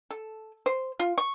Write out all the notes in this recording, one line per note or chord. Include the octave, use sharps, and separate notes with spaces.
A4
C5
F4
C#6